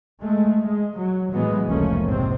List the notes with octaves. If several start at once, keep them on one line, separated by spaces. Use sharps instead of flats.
G#3 A3
G#3
F#3
A2 E3 F#3 G#3 B3
F1 C#2 F3 A3 A#3 C#4
A#1 G#2 C3 C4